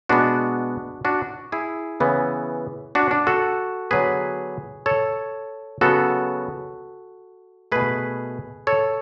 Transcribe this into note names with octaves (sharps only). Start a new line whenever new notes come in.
B2 G#3 B3 D4 F#4
D4 F#4
E4 G#4
C#3 E3 B3
D4 F#4
D4
F#4 A4
D3 F#3 B3 G#4 B4
A4 C#5
C#3 F#3 B3 F#4 A4
B2 A3 G#4 B4
A4 C#5